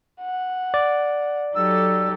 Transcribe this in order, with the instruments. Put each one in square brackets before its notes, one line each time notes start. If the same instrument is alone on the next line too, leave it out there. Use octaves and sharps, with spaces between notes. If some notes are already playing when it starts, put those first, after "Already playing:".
[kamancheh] F#5
[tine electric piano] D5
[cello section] F#3 A4 [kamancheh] D#4 G4 [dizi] E6